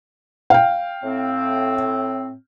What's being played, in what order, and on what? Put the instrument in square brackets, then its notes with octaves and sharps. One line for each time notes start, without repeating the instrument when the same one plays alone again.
[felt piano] F5 G5
[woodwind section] A2 C4